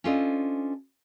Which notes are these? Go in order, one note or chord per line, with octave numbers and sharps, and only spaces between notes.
C#4 D4 F4 A4 C5 D#5